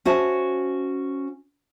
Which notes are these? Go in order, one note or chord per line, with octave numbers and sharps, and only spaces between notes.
C#4 F#4 C5 E5 A5